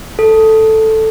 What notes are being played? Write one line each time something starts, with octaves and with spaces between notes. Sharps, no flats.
A4